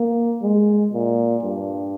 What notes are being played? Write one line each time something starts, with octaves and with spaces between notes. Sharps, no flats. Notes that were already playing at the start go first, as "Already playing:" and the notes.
Already playing: A#3
G#3
A#2
G2